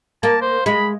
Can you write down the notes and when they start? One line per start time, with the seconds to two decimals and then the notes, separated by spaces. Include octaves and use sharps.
0.23 A#3 A5
0.42 C5
0.66 G#3 B5